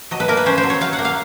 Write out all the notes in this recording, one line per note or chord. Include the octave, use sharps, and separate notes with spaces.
F#3 D#5
B4
A#3 A#4
B4
C#4 C5
C5
F#3
C#5
F#3 F5
F#5
A#3
F5